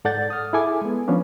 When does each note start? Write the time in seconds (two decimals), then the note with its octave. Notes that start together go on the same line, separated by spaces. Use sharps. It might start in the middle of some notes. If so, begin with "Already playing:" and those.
0.05 G#2 A4 D5 F#5 G6 A6
0.30 D#6 F6
0.53 E4 G#4 A4 G#5 D6
0.81 G#3 B3
1.08 F3 B3 C#4 D4